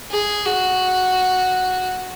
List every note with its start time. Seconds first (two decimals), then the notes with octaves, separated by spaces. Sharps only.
0.11 G#4
0.46 F#4